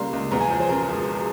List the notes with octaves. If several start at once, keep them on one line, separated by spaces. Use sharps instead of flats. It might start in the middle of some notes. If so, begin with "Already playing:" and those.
Already playing: C#2 C#3 G3 A#3 A#5 C6
C#2
E2 A#5
G#5
F3
C5
C#3 A#4
E1